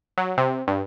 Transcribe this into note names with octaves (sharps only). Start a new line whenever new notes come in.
F#3
C3
G2